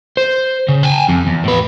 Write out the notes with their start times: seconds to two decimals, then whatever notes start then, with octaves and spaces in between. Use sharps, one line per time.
0.17 C5
0.69 C#3
0.83 G5 G#5
1.09 F2
1.27 E2
1.44 A2 B4